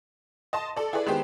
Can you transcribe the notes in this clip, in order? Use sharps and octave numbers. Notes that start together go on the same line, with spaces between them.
D#5 A5 C6
A4 D5
E4 G#4 B4 D5
D#3 G#3 B3 G4 C5